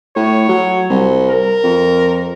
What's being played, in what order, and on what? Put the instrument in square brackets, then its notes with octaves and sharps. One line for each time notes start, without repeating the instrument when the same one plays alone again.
[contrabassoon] A2 [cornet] C#5
[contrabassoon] F#3
C2
[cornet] A#4
[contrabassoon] F2